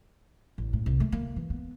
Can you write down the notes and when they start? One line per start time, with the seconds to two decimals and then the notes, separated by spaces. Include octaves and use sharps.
0.58 A1
0.73 A2
0.86 C2
1.00 A3
1.12 A#3
1.36 E3
1.50 B3